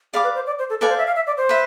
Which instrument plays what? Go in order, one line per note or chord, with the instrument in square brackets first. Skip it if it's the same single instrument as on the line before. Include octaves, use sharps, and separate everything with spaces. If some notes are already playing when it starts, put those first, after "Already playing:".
[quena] G#4 [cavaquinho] D5 F5 B5 D6
[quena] B4
C5
D5
C5
A4
[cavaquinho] A4 D5 F5 G#5 [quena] B4
[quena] C5
E5
F5
E5
D5
C5
[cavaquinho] B4 E5